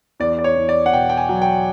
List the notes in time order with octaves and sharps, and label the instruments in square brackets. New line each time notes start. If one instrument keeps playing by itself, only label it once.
[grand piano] E2 D5
D5
C#5
E2
D5
F#5
B2 G5
G5
G#5
F#3
G5